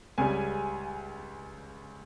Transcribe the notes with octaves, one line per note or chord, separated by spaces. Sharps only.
C#2 C#3 G3 G#5